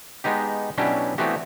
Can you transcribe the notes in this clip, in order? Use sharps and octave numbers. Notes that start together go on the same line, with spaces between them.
G#3 B3 D#4 G4
B2 F#3 C#4 D4 E4 G4
E3 A3 B3 C4 F#4 G4